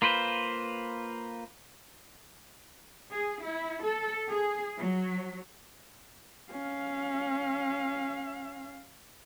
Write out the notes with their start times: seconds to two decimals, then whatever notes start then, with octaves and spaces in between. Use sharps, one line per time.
0.02 A#3 F4 B4 C5
3.09 G#4
3.42 E4
3.83 A4
4.30 G#4
4.78 F#3
6.51 C#4 F5